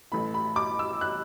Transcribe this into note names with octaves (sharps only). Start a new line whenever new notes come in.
A1 A2 E3 A3 B5
B5
D6
E6
F#6